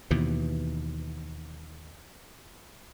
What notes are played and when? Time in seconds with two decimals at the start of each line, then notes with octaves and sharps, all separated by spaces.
0.11 D#2 B2 E3